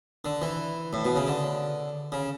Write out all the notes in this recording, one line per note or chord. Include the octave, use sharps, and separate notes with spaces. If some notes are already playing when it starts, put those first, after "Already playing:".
D3
E3
A2
B2
C#3
D3
C#3